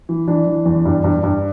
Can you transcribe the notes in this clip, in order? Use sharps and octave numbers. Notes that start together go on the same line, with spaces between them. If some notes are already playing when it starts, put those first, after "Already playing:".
E3
E3 D4
E3
E2
G2
G2
G2